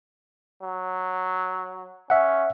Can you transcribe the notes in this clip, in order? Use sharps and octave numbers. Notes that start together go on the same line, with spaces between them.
F#3
C#4 E5 F#5